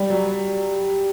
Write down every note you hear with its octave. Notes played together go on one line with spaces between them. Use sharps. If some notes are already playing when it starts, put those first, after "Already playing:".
Already playing: G3
F#3